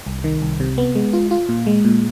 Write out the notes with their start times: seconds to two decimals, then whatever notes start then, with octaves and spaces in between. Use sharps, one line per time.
0.07 C2
0.24 D#3
0.42 C2
0.60 C3
0.78 B3
0.95 G#3
1.13 F4
1.31 F4
1.49 A#2
1.67 G#3
1.85 A#2